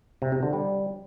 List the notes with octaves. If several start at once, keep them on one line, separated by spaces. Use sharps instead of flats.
C3
C3
D3
G3